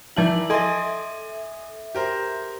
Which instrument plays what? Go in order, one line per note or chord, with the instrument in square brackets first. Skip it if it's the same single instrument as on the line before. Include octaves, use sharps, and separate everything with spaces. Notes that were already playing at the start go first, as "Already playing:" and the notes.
[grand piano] E3 E4 D5 [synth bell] F3 A5 F#7
[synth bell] A4 E5 [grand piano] D#5 G#5 C6
[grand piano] G4 A#4 C5